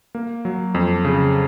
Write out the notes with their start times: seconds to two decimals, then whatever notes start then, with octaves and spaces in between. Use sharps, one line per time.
0.15 A#3
0.45 F#3
0.75 F2
1.05 C#3